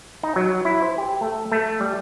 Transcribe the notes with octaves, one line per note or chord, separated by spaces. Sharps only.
D#4
F#3
E4
C5
G4
A3
A3
G3